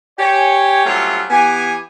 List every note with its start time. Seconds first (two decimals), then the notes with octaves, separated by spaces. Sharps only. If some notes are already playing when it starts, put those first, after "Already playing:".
0.19 G4 C#5 G#5
0.86 F#3 G3 A3 C4 C#4 F4
1.30 E3 B3 G4 G#5